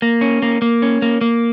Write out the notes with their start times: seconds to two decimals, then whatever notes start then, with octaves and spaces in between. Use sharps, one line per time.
0.02 A#3
0.21 C#4
0.42 A#3
0.62 A#3
0.82 C#4
1.02 A#3
1.21 A#3